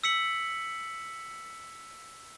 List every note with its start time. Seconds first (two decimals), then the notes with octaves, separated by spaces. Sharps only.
0.04 E6 B6 C#7 F#7